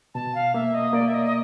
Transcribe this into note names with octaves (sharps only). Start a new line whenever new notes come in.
B2 A5
F5
A#3 E5
D#5
A#3 D5
E5
D#5
D#5